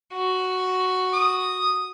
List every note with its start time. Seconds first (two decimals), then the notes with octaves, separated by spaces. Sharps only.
0.14 F#4
1.13 D#6